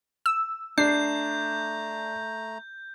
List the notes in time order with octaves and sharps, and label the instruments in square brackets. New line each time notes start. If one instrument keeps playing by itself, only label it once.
[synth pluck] E6
[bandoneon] A3 A#5 [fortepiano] D4 [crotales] G6 [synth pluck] C7